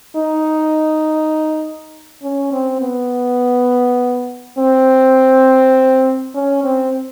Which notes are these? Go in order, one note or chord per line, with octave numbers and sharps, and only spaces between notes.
D#4
C#4
C4
B3
C4
C#4
C4